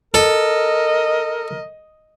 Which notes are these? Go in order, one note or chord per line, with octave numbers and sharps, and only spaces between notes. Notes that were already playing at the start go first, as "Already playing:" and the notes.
A4 A#4 D#5